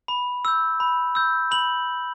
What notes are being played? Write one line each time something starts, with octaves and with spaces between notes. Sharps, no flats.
B5
E6 G6
B5
E6 G6
B5 F#7